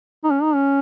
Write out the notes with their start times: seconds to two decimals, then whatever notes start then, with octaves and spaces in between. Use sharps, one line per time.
0.24 D#4
0.31 C#4
0.43 D#4
0.55 C#4